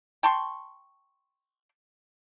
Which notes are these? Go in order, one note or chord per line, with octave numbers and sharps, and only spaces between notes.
G5 A5 C6 C#6